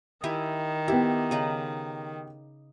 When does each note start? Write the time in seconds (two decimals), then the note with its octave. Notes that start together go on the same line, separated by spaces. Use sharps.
0.24 D#3 E4 G4 G#5
0.88 B3 E4 G4
1.31 C#3 D#4 B4